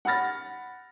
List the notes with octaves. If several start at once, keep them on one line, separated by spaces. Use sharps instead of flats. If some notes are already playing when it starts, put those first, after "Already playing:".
F#5 B5 F6 A6 A#6